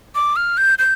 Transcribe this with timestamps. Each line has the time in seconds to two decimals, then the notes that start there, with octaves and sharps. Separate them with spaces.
0.15 D6
0.36 F6
0.57 G6
0.79 G6